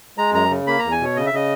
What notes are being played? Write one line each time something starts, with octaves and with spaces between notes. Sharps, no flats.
G#3 A#5
F#2 A#5
C#3
A#3 B5
E2 A#5
G#5
B2 C#5
C#3 D#5
E5
C#3 D#5